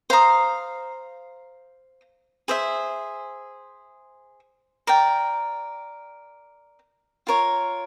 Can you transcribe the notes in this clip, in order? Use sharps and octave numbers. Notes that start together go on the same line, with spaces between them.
C5 F5 A#5 D#6
G#4 C5 E5
A#4 D5 G5
F4 A#4 C#5